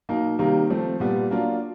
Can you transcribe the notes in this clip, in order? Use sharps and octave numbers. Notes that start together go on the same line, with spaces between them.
B2 F#3 A#3 D#4
C3 D#3 G3 A#3 D#4
F3 A3 C4
A#2 G3 B3
F#3 A#3 D4 F4